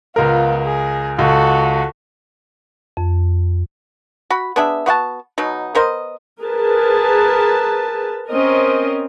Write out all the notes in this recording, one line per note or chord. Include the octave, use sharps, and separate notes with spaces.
C#2 B3 F4 A#4
G#4
C#2 F#4 A4
F2
F#4 B5
B3 D4 G#4 E5
B3 F#4 F#5 A5
B2 F#3 D#4
B3 A#4 C5 D#5
G#4 A#4 B4 A5
C4 C#4 A#4 D#5